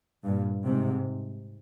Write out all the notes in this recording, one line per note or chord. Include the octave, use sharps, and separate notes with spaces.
G2 A#2
G#2 C3